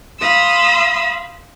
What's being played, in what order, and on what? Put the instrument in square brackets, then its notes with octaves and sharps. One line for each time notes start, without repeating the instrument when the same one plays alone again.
[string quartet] F5 B5 C6 D#6 E6